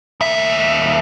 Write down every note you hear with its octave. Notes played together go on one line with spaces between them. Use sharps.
D#2 E5